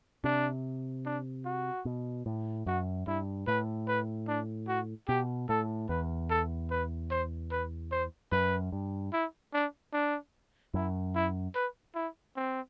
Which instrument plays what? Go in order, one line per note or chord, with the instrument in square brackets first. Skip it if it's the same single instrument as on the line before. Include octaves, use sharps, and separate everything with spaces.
[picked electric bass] C3 [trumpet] D4
[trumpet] D4
F#4
[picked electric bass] B2
A2
[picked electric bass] F#2 [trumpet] F#4
[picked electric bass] G2 [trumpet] E4
[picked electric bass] A2 [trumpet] B4
[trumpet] B4
D4
F#4
[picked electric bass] B2 [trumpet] G4
[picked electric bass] A2 [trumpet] A4
[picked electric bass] E2 [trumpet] B4
[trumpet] A4
B4
C5
B4
C5
[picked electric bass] F#2 [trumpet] B4
[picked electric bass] G2
[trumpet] E4
D4
D4
[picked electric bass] F#2 [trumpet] E4
[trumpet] E4
B4
E4
C4